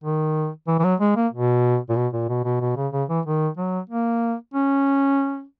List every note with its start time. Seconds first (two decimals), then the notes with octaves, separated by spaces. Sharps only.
0.04 D#3
0.68 E3
0.79 E3
0.84 F#3
1.00 G#3
1.16 A#3
1.32 B2
1.89 A#2
1.96 B2
2.13 A#2
2.29 B2
2.45 B2
2.61 B2
2.77 C#3
2.93 C#3
3.09 E3
3.26 D#3
3.57 F#3
3.90 A#3
4.54 C#4